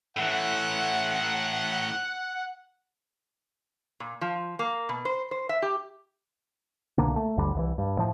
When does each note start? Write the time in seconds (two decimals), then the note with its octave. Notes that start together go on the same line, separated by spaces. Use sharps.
0.17 A2 E3 F#5
4.00 A#2
4.21 F3
4.59 A#3
4.89 B2
5.05 C5
5.31 C5
5.49 E5
5.62 G4
6.98 C2 B2 D3 A#3
7.16 A3
7.37 G1 D2 D3 G3
7.55 C2 D#3 E3
7.78 G2
7.98 A2 F3